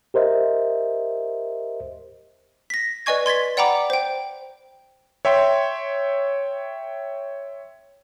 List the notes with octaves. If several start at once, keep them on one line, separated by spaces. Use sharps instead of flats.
G4 A#4 C5 D#5 E5
A#6 B6
B4 D5 D#5 G#5 C#6 G#6
C6 G#6 A6 B6
D5 F#5 G5 A#5 B5 D6
C5 G5
C#5 E5 G5 C6